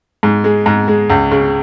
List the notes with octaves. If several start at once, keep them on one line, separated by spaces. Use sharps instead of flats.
G#2
G#3
G#2
G#3
C#2
C#3